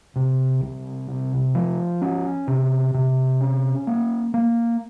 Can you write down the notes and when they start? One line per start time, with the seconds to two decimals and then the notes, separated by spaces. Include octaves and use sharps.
0.16 C3
0.61 C2
1.08 C3
1.55 F3
2.02 C#4
2.48 C3
2.94 C3
3.41 C#4
3.87 A#3
4.34 A#3